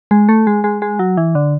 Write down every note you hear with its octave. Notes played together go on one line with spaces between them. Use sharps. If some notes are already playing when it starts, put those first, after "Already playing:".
G#3
A3
G#3
G#3
G#3
F#3
E3
D3